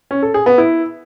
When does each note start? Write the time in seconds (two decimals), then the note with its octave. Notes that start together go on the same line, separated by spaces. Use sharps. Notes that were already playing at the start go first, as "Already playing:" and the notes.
0.11 C#4
0.22 A4
0.34 G#4
0.46 B3
0.58 E4